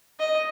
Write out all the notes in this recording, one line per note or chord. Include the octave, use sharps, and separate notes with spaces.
D#5